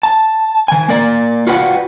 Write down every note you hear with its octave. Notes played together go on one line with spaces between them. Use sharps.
A5
D#3 G#5
A#3 A#4 D5
F4 F#4 B4 D5 F#5 G5